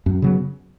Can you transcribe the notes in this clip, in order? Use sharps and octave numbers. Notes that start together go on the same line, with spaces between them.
F#2
C#3 F#3 B3